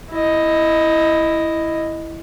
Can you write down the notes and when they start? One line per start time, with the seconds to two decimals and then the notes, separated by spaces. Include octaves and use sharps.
0.10 E4 D#5